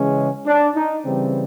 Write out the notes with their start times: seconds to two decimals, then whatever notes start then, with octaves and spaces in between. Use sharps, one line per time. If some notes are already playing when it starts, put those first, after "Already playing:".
Already playing: C#3 E3 G#3 C#4
0.46 D4
0.76 D#4
1.05 C#3 E3 G3 C4